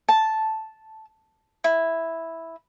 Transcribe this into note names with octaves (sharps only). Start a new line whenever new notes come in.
A5
E4